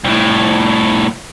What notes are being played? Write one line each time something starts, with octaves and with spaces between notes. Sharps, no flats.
C2 A2